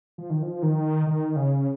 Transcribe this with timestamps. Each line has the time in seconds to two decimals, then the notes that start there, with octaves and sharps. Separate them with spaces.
0.18 F3
0.30 D#3
0.42 F3
0.62 D#3
1.07 D#3
1.36 C#3